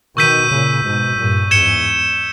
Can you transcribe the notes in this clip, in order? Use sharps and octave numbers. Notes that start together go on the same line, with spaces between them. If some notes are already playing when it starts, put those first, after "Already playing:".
B2 D#3 C#6 E6 G6 B6 D#7
A#2 C#3
G#2 B2
G2 A#2
E2 G#2 G#6 C#7 E7 G7